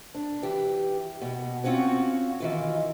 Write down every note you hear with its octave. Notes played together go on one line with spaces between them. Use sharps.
D4
E3 G4
B2
C4 C#4 F4 F#4 C#5
D#3 E3 F4